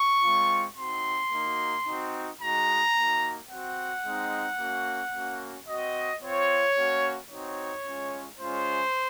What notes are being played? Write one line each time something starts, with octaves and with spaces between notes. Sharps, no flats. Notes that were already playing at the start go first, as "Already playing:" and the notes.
Already playing: C#6
G#3 C4 F4
C4 D#4 F#4 C6
A#3 D#4 F#4
C4 D#4 F#4
G#3 D#4 F#4 A#5
A#3 D#4 F#4
C4 F#4 F#5
G#3 C4 D#4
A#3 C#4 F#4
A#3 C#4 F#4
C4 F#4 D#5
C4 F4 C#5
A#3 C#4 F#4
C4 D#4 F#4 C#5
G#3 C#4 F4
G#3 C#4 F4 C5